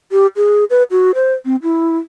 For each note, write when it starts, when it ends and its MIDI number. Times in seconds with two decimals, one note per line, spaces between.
0.12 0.27 67
0.36 0.65 68
0.70 0.83 71
0.91 1.11 66
1.15 1.34 72
1.45 1.56 60
1.63 1.97 64